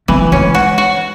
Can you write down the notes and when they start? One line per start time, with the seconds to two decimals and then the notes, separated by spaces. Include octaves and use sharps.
0.08 E3 A3
0.32 G#3 C#4
0.55 F#4
0.78 F#4